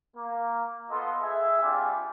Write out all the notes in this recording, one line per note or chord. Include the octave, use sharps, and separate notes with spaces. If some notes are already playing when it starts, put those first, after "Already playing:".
A#3
B3 F4 A4 D#5 C6
G#4 E5
G3 C4 D4 F4 G4 G#5